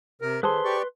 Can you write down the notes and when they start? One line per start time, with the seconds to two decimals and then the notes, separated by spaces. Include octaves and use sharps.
0.22 C3 A#4
0.43 D#3 G#4 A4 B4 C5 C6
0.64 G4 D5 C#6